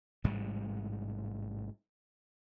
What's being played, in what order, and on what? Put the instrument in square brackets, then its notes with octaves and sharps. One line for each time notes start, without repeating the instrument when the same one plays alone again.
[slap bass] A1 G#2 C3 G3